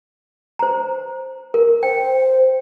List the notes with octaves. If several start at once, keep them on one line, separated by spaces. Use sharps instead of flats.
C5 A#5
A#4
C5 G5